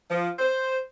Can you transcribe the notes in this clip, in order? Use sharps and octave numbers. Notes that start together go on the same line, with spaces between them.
F3
C5